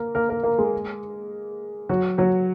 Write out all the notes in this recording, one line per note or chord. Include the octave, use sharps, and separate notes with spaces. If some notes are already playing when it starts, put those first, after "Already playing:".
Already playing: A#3 A#4
A#3 A#4
A#3 A#4
A#3 A#4
G#3 G#4
F#3 F#4
F#3 F#4